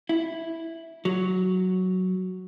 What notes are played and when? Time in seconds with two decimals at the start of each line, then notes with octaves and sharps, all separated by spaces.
0.09 E4
1.05 F#3